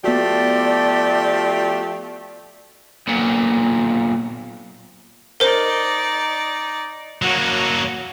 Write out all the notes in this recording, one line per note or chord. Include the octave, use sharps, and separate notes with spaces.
F3 A3 B3 F#4 G4 D5
B1 A#2
D#4 A#4 C5 D5
F#3 A#3 F#4 C#5